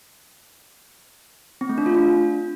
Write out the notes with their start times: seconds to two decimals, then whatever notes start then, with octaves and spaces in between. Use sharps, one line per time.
1.61 C4
1.69 A3
1.78 D4
1.86 F4
1.94 D4